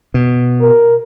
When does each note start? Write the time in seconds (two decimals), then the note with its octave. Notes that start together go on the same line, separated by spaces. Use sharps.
0.14 B2
0.61 A#4